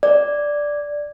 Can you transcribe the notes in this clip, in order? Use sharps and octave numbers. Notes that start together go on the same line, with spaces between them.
D5